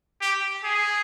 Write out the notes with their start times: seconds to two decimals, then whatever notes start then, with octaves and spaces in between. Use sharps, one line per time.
0.21 G4
0.64 G#4